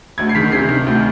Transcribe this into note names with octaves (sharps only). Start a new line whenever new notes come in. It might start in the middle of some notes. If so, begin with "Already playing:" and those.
D2 G#6
C7
D#3 B6
C3 C7
D#3
D2